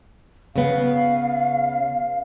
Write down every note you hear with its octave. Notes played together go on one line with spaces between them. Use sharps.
C#3 B3 F5